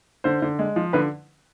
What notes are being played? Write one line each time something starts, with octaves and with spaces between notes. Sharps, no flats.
D3 C5
D3
G#3
F3
D3 B4